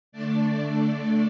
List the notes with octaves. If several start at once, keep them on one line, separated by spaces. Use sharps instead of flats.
D3 A3 D4 A4 D5